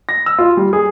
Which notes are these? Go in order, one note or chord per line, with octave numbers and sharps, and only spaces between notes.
A#6
E6
F4
G3
G#4